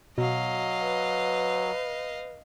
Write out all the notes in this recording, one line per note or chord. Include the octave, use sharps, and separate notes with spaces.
B2 F#3 D#5 F5
B4